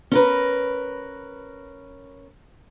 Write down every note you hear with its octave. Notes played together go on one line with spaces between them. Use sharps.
C#4 A#4 B4